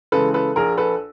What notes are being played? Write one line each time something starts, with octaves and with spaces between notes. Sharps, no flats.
C#3 E3 G#3 A4 B4
A4 B4
A#1 G#4 A#4
A4 B4